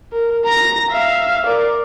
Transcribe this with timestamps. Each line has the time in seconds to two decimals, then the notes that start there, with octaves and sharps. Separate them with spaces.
0.12 A#4
0.45 A#5 A#6
0.91 E5 F5
1.46 A#4 D5